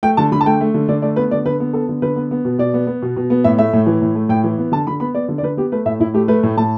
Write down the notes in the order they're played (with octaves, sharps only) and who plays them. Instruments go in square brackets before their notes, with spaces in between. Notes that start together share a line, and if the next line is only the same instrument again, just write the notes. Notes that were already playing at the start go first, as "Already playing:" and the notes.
[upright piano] A3 G5
D3 A5
D3 B5
A5
A3 G5
A3
D3
D3 D5
A3 D5
B3 B4
D3 D5
D3 B4
B3
B3 A4
D3
D3 B4
B3
B3
B2
B2 D5
B3
B3
B2
B2
B3
A2 E5
A3 E5
A2
E3
A2
A3
A2 G5
E3
B3
D3 A5
D3 B5
B3 B5
B3 D5
D3
D5
D3 B4
B3 G4
A3 B4
A2 E5
A2 E4
A3 G4
A3 B4
A2
A2 A5